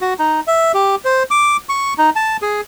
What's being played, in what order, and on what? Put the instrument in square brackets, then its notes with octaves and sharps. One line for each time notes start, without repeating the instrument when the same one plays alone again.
[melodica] F#4
D#4
E5
G4
C5
D6
C#6
D#4
A5
G#4